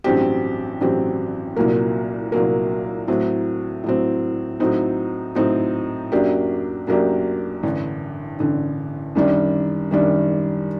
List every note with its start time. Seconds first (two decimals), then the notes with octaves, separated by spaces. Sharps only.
0.04 A1 G2 F#3 C4 G4
0.81 A1 G2 F#3 C4 G4
1.56 C2 A#2 F#3 A#3
2.32 C2 A#2 F#3 A#3
3.08 A2 F#3 C4
3.84 A2 F#3 C4
4.60 A2 F#3 C4 D#4
5.35 A2 F#3 C4 D#4
6.12 F#2 F#3 A#3 D4 G4
6.87 F#2 F#3 A#3 D4 G4
7.63 A1 G2 D3
8.39 A1 G2 D3
9.15 F#2 D#3 G3 D4
9.91 F#2 D#3 G3 D4